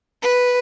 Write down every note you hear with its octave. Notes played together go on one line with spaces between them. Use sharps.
B4